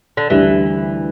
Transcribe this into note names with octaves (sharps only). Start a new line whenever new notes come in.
D3
D2 D3 E3 G3 E4 G4